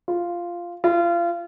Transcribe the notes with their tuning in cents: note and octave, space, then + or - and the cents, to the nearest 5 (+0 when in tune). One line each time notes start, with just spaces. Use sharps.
F4 -5
F4 -30